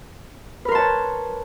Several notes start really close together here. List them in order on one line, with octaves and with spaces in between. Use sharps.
B4 A#4 C6 A5 C#5